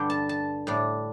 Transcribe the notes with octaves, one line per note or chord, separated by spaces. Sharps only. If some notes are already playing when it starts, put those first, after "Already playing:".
Already playing: G2 D3 G3 G5
A5
A5
A2 G3 D4